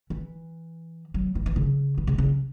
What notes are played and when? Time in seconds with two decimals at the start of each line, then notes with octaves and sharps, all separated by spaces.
0.10 E3
1.14 F#3
1.35 E3
1.46 E3
1.56 C#3
1.97 E3
2.07 C#3
2.18 C#3